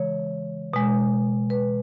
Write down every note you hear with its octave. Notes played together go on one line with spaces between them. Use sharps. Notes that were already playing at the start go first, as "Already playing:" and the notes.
Already playing: C#3 E3 G#3 C#5
B2 G#3
B4